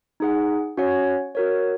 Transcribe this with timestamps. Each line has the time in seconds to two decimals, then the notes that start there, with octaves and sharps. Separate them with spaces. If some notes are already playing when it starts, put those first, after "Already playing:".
0.20 D#4 G#4 F#5
0.77 C#4 F#4 C#5 F#5
1.35 F#4 A#4 C#5